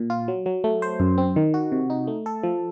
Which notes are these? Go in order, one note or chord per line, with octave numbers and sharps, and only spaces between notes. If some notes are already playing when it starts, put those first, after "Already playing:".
Already playing: A#2
F4
F#3
F#3
A3
C5
F#2
C4
D#3
F#4
C3
D#4
A3
A4
F3